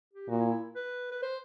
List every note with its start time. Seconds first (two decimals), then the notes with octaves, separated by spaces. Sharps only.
0.14 G4
0.29 A#2 F#4
0.40 E4
0.50 E4
0.76 B4
1.12 B4
1.23 C5